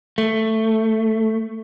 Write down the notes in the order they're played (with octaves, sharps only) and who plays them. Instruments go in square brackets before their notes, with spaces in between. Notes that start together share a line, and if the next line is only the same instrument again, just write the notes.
[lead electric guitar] A3